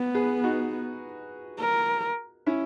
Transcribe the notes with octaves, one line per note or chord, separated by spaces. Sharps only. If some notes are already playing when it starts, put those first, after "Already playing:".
Already playing: B3
G#4 B4
D#4 F#4
A#4
C#4 E4